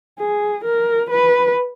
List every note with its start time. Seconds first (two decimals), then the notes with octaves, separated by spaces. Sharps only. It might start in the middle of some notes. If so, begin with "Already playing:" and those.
0.19 G#4
0.65 A#4
1.10 B4